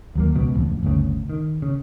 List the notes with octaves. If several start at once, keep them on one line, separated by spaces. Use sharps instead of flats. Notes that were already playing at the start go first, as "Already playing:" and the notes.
D#2 F#3 A#3
C#2 B2
D1 A1 F2
G1 D2 C#3
D#3
C#3